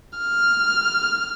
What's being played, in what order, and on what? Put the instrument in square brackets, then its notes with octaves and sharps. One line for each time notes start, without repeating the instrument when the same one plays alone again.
[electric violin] F6